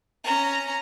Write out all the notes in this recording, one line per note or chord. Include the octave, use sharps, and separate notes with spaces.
C#4 A#5